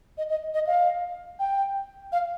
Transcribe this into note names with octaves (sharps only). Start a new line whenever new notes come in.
D#5
D#5
D#5
F5
G5
F5